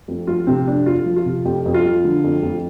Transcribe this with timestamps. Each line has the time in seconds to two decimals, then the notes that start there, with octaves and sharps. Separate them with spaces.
0.08 F2
0.27 F3 F4
0.47 C3 C4
0.66 F2 D4
0.86 F2 F4
1.06 F3
1.16 F4
1.25 C3
1.45 F2 G4
1.65 F2
1.74 F4
1.85 F3
2.05 D3
2.24 F2
2.43 F2